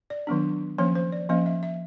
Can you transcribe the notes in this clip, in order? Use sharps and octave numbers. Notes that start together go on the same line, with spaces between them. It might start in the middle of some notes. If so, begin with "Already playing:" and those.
D5
D#3 F#3 B3 D4
F3 A#3 C#4 C#5
C5
D5
F3 A#3 C#4 D#5
E5
E5